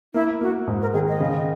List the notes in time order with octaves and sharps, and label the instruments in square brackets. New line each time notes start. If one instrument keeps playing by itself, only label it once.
[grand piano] A#3 [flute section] E4
[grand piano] A#3 [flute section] F#4
[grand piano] G#2
[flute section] A#4
[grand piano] D#3 [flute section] G#4
[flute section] D#5
[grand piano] C#3